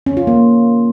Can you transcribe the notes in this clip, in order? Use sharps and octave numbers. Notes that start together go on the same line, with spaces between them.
C#4
F4
A#3